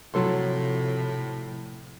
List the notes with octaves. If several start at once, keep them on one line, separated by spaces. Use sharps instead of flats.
A2 C3 F3 F#3 A4 C6